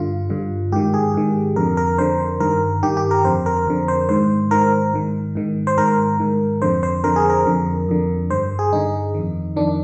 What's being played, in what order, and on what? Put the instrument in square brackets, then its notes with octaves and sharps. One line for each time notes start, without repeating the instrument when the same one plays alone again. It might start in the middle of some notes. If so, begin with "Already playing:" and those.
Already playing: [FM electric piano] G2 D3 F4
G2 D3
G#2 D#3 G4
G#4
G#2 D#3
F2 D3 A#4
A#4
F2 D3 C5
G2 D#3 A#4
G2 D#3 G4
G4
A#4
F2 D3 C5
A#4
F2 D3
C5
G#2 D#3 C5
G#2 D#3 A#4
G#2 D#3
G#2 D#3
C5
G#2 D#3 A#4
G#2 D#3
F2 D3 C5
C5
F2 D3 A#4
G#4
A#4
F2 D3
F2 D3
G2 D3 C5
G#4
G2 D3 D#4
F2 D#3
F2 D#3 D4